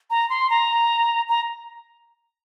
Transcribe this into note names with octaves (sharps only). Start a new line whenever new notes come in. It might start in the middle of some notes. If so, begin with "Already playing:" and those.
A#5
C6
A#5
A#5